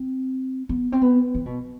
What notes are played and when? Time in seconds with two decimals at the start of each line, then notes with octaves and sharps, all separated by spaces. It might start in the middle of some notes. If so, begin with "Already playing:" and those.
Already playing: C4
0.69 B3
0.92 C4
1.02 B3
1.35 E3
1.46 B2